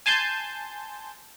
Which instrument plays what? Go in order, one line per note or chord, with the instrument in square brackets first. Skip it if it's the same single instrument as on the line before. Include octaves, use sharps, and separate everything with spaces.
[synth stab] G#5 A5 C6 G6